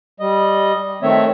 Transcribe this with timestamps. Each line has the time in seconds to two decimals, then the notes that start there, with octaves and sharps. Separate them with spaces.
0.20 G3 D#5
1.03 D#3 A3 C4 C#5 E5